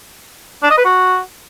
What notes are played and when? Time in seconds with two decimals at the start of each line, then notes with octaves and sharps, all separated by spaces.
0.63 D4
0.70 D#5
0.77 B4
0.85 F#4